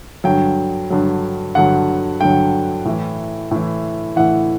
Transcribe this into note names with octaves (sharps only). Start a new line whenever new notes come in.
G2 D3 F#3 G5
G2 D3 F#3
G2 D3 F#3 F#5
G2 D3 F#3 G5
A2 E3
A2 E3
A2 E3 F#5